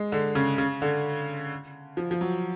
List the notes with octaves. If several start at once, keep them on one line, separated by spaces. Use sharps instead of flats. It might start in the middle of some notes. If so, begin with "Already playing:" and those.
Already playing: G#3
D3
C#3
C#3
D3
F3
F3
F#3